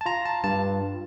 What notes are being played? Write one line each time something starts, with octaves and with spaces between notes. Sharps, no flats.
A5
F4 A#5
A5
G2 A5